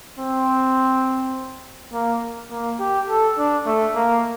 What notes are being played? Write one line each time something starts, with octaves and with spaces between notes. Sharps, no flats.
C4
A#3
A#3
G4
A4
D4
A3
A#3